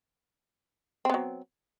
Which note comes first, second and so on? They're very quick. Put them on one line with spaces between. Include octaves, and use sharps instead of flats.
C4 B3 F#3